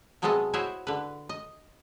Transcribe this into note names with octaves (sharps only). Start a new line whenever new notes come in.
C3 F#3 G#3 B3 A4 D#5
E4 F#4 C5 C#5 D#5 E5
D3 B4
D#5